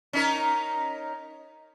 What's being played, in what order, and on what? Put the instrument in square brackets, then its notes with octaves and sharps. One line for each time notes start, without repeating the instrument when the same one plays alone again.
[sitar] C#4 D#4 A#4